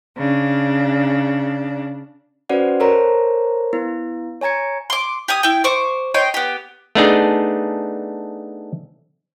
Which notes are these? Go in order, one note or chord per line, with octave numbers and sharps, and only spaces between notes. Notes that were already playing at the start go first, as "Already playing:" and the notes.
C#3 D4
C#4 F#4 B4 C5 D5 F#5
A4 A#4 C5 C#5 A#5
B3 E4
C#5 G#5 A#5 G#6 C#7
C6 D6
G4 G#5 D#6
E4 G5
C5 C#6 D6
C#5 D#5 G5 C6
B3 G4
A3 B3 D4 D#4 G#4